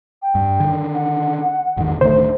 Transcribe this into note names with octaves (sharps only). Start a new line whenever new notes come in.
G5
G2
D3 D#3
F#5
G#1 E2 D#3
D1 D3 D#3 A3 C5